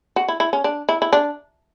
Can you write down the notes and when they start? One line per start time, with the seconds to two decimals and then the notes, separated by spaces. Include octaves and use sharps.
0.16 F#4
0.28 E4
0.40 E4
0.53 C#4
0.64 D4
0.89 E4
1.02 E4
1.13 D4